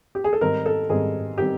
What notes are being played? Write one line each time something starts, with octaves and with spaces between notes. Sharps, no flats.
G4
G#4
A4
G#2 D#3 G3 C4 A#4
A4
G#2 D#3 G3 C4 G#4
D#3 G3 C4 G4